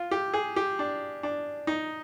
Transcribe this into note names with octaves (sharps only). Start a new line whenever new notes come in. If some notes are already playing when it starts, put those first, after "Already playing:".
Already playing: F4
G4
G#4
G4
D4
D4
D#4